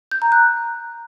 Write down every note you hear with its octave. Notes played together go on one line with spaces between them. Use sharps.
G6
A#5
F#6